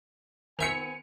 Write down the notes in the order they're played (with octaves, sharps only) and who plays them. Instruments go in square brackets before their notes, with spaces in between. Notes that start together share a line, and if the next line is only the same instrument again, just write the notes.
[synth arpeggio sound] D#3 E5 E6 [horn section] B3 C4 G#5 [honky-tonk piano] C#7 F7